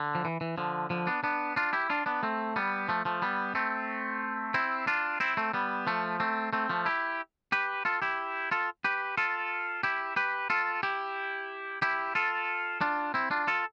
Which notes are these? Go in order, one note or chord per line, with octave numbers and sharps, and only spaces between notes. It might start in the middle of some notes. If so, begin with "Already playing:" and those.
Already playing: D3
F3
E3
E3
D3 F3
D3 F3
B3 D4
B3 D4
D4 F4
E4 G4
D4 F4
B3 D4
A3 C4
G3 B3
F3 A3
F3 A3
G3 B3
A3 C4
C4 E4
D4 F4
C4 E4
A3 C4
G3 B3
F3 A3
A3 C4
A3 C4
F3 A3
E4 G4
G4 B4
F4 A4
E4 G4
F4 A4
G4 B4
F4 A4
E4 G4
G4 B4
F4 A4
E4 G4
E4 G4
F4 A4
D4 F4
C4 E4
D4 F4
F4 A4